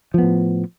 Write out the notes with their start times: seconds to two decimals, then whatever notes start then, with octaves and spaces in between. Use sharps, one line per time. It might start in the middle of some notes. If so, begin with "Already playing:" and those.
0.14 F3
0.18 B3
0.23 A2